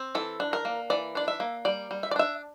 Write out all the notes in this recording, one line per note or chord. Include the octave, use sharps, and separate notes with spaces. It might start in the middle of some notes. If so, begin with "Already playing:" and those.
Already playing: C4
E3 A4
D4
A#4
A#3
E3 D5
D4 D5
E5
A#3
G3 D5
G3
E5
D5
D4 E5